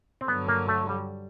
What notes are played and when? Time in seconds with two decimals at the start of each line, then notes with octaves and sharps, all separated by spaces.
0.21 C4
0.28 G2 D3 F#3 B3
0.48 A#3
0.68 A3
0.89 G3